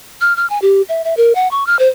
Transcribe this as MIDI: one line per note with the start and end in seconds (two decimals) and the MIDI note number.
0.21 0.35 89
0.37 0.48 89
0.50 0.61 80
0.62 0.82 67
0.89 1.04 76
1.04 1.14 76
1.17 1.33 70
1.35 1.50 78
1.51 1.66 85
1.67 1.79 89
1.79 1.88 72